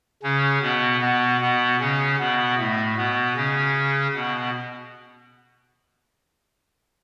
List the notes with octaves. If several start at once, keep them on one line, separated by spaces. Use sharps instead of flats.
C#3 C#4
B2 B3
B2 B3
B2 B3
C#3 C#4
B2 B3
A2 A3
B2 B3
C#3 C#4
B2 B3